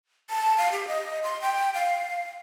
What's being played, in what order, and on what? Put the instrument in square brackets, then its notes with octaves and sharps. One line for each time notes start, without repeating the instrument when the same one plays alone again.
[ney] A5
F5
G4
D#5
C6
G5
F5